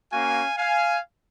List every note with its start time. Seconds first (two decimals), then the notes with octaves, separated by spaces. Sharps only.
0.12 A#3 C#4 F#4 F5 G#5
0.58 F5 G#5